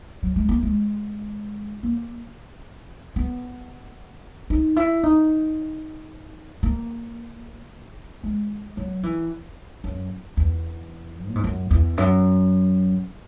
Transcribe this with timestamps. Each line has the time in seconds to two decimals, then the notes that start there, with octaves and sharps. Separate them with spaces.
0.23 F#3
0.36 G#3
0.49 A#3
0.63 G#3
1.83 A#3
3.16 B3
4.50 D#4
4.76 E4
5.03 D#4
6.63 A#3
8.24 G#3
8.77 F#3
9.03 E3
9.84 F#2
10.37 E2
11.28 A#2
11.35 G#2
11.44 F#2
11.71 E2
11.98 F#2